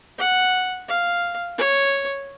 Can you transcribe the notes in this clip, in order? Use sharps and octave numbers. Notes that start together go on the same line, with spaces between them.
F#5
F5
C#5